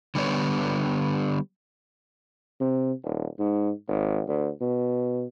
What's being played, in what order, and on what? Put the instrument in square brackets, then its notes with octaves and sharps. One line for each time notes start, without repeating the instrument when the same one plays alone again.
[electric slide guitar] D3 G3 B3 C#5
[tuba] C3
D#1
G#2
G#1
D2
B2